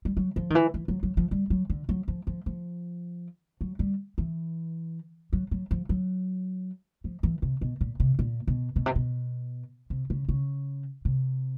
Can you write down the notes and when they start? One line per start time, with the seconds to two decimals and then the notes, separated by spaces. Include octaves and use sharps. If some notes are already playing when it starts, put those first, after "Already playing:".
0.05 G3
0.17 F#3
0.36 F3
0.50 D#3
0.55 E3
0.74 E3
0.88 F#3
1.03 F#3
1.17 F3
1.31 G3
1.50 F#3
1.70 D3
1.89 F#3
2.08 F3
2.27 F3
2.46 F3
3.61 F#3
3.79 G3
4.18 E3
5.33 F#3
5.51 F#3
5.71 F3
5.89 F#3
7.04 F3
7.23 E3
7.42 C3
7.61 B2
7.81 A#2
8.00 C3
8.19 A#2
8.47 B2
8.76 B2
8.86 C3
8.95 B2
9.90 C3
10.10 C#3
10.29 C#3
11.05 C3